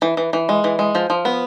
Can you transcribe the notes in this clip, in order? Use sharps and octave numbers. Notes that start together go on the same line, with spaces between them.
E3
E3
E3
G#3
E3
G#3
F3
F3
B3